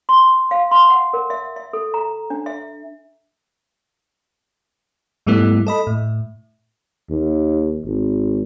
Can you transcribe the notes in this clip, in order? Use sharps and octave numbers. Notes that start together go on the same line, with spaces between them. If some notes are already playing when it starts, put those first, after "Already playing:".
C6
F5
C6
F#5
A#4
E5
E5
A4
A#5
D4
E5
G#2 G3 A3 B3 E4
A4 D#5 B5
A2
D#2
G#1